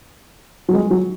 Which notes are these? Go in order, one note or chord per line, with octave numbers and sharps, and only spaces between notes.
F#3
G#3
F#3